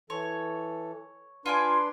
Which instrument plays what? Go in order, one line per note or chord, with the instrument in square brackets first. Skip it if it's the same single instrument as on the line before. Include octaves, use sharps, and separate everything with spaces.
[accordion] E3 A4 [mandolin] C#5
[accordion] D4 B4 C6 [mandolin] F4 G#5 D6